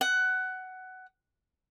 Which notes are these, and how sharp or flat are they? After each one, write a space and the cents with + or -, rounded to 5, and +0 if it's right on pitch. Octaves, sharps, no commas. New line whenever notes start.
F#5 +15